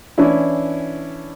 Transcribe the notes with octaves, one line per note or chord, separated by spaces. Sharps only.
E3 C#4 D4 E4